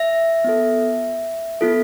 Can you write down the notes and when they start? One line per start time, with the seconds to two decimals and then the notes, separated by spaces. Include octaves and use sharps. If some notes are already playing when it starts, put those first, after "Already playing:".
Already playing: E5
0.44 B3 F4 A4
1.61 B3 F4 A4